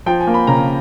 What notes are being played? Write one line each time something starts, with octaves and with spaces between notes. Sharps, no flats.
F3 G5
G#5
A#3
B5
C#3 A#5